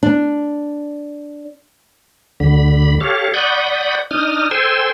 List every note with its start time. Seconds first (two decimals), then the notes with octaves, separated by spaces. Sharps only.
0.03 D4
2.40 D2 D3 B5
3.00 G4 A4 C#5 F5
3.34 D5 F#5 B5 C#6 D#6 G6
4.11 D4 D#4 D#6 F6
4.51 A4 C5 G5 G#5 C6 E6